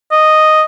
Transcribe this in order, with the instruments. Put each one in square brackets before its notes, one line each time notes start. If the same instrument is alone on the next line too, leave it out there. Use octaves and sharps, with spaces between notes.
[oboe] D#5